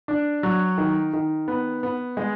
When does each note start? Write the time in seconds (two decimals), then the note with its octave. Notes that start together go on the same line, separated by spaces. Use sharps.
0.08 D4
0.43 F#3
0.78 D#3
1.13 D#3
1.48 B3
1.83 B3
2.17 G#3